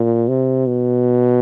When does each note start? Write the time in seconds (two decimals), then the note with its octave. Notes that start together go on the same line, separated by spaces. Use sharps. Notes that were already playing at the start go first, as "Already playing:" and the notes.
Already playing: A#2
0.28 C3
0.67 B2